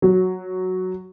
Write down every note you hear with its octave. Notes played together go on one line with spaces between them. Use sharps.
F#3